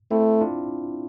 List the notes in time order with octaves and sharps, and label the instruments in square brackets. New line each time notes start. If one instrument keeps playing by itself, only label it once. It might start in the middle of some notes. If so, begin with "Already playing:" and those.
[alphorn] A3 [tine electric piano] C4 E4
[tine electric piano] D4 F4